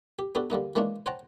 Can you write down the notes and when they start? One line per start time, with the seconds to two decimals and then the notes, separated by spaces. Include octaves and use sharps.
0.19 G4
0.35 B3 D4 F#4 G4 A4
0.50 D3 G3 A#3 D#4
0.76 D#3 E3 G#3 A#3 C#4 D4
1.06 C5 C#5 F#5 G5 A5 A#5